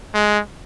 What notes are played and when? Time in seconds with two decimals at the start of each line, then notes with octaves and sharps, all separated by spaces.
0.14 G#3